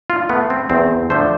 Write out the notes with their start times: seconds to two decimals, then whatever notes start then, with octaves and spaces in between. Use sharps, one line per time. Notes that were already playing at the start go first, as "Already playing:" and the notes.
0.10 F4
0.29 A3 B3
0.50 C4
0.70 E2 C4
1.10 D3 F3 A3 C5